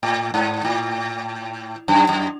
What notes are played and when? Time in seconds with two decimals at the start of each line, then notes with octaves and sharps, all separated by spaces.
0.03 A2
0.34 G#2
0.65 A2
1.88 F#2
2.09 F#2